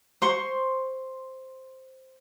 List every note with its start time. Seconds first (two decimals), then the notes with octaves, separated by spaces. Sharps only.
0.22 C5 C6 C#6